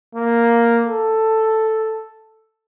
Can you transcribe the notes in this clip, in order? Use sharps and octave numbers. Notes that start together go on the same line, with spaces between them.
A#3
A4